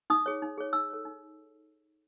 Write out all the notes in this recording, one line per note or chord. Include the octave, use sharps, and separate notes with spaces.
D#4 D#6
G#4 C#5
D#4
G#4 C#5
D#4 E6
A4 C#5
D#4